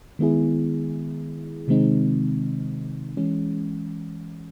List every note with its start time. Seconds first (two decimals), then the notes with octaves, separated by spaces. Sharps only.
0.19 D#3 G#3 B3 E4 G#4
1.68 C3 D#3 G#3 C4 D#4
3.17 E3 G#3 C#4